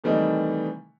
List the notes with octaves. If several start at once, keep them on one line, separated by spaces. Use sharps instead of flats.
C3 D#3 E3 G3 A3 D#4